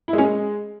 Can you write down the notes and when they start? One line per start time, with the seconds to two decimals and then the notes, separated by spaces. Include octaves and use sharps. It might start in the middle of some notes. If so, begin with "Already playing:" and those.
0.08 E4
0.13 G#3
0.18 C#4
0.23 G#3